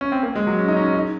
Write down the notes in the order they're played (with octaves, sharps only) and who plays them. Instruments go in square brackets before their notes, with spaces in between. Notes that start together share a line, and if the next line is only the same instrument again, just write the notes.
[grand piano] C#4
C4
A#3
G#3
F#3
C#4
D#4
C#4
D#4